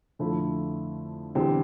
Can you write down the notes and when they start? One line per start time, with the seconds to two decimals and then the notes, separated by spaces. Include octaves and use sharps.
0.19 F2 D3 F3 A3 E4
1.35 E2 D3 G3 C4 G4